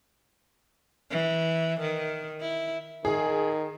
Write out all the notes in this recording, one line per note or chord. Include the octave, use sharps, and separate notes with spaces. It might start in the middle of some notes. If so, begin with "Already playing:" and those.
E3
D#3
E4
D#3 G#4